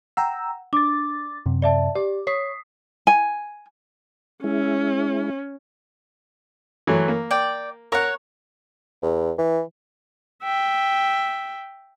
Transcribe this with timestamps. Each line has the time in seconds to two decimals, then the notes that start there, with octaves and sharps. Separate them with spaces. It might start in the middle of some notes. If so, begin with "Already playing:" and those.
0.17 F#5 G5 A#5 E6
0.73 D4 D6 A6
1.46 F#2 C3
1.62 D5 E5 A5
1.95 G4 D5
2.27 C#5 D#6 B6 C7
3.07 G#5
4.44 G#3 C#4 E4
6.87 E3 F#3 A3
7.08 A#3
7.31 D5 G5
7.92 A#4 C#5 F#5 A#5
9.03 E2
9.38 E3
10.43 E5 G5